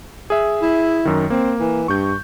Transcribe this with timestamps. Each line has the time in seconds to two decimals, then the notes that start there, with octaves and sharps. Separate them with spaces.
0.30 G#4 E5
0.62 E4
1.05 F#2 D#3
1.30 A#3 C4
1.60 E3
1.88 G2 C#6 G6